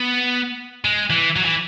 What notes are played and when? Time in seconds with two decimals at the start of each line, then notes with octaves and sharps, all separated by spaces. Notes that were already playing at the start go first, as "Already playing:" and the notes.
Already playing: B3
0.84 G#3
1.10 E3
1.36 F#3
1.45 E3